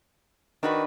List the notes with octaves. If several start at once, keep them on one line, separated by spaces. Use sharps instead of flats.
D#3 D4 F#4 B4